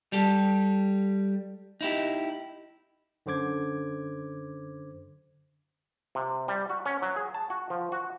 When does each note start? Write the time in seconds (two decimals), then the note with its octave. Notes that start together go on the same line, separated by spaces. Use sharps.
0.12 G3 G4 A4
1.81 D#4 E4 G4
3.26 F#2 D3 C5 D6 G#6
6.15 C3
6.48 G3
6.70 F#4
6.86 C#4
7.02 F#3
7.16 G#4
7.34 A5
7.50 F#4
7.70 F3
7.92 F#4